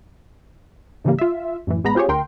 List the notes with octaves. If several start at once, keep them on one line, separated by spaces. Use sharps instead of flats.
G#2 C#3 E3 G3 A#3
F4 E5
F#2 A2 E3
A1 G#3 B3 A#5 B5
C4 F4 G4 G#4 C#5
D2 A#4 G5 C6